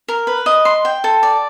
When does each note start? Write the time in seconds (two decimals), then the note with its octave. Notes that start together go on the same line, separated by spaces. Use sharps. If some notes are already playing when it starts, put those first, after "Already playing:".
0.08 A#4
0.27 B4
0.46 D#5
0.65 C6
0.85 G5
1.04 A4
1.23 D5